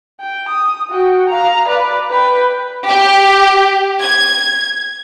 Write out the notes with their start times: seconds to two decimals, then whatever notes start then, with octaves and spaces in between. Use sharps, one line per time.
0.20 G5
0.48 D#6
0.90 F#4 G5
1.29 F5 A#5
1.67 B4 D5
2.10 B4 G5
2.88 G4
4.02 G#6